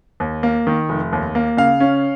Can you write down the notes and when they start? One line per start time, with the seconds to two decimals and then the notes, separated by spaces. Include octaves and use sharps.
0.20 D#2
0.43 A#3
0.67 D#3
0.89 F1
1.13 D#2
1.35 A#3
1.57 C#3 F5
1.80 C#4